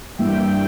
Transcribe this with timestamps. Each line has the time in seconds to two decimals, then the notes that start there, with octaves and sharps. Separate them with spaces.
0.18 G2 E3 G3 A#3 E5 G5
0.48 G5